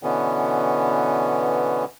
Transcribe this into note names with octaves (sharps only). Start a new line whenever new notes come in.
B2 D3 E3 B3 C#4